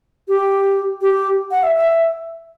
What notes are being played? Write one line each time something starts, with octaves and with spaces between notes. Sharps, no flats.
G4
G4
F#5
E5
E5